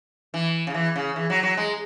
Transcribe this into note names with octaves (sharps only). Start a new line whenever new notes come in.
E3
C#3
E3
C#3
E3
F#3
F#3
G#3